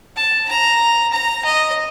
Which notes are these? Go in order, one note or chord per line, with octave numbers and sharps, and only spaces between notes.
A5
A#5
A#5
D#5